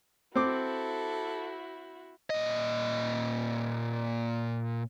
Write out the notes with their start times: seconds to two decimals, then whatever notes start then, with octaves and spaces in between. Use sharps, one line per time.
0.35 C4 E4 F#4 A4 D6
2.30 A#2 D#5